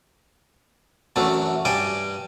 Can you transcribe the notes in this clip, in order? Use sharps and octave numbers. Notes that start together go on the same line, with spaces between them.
F#2 E3 F#3 A3 D4
G2 G3 D5 G5 G#5